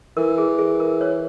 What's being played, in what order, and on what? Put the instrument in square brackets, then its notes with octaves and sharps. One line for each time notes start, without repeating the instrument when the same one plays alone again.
[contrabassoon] E3 [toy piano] A#4
[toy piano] G#4
G#4
A#4
C#5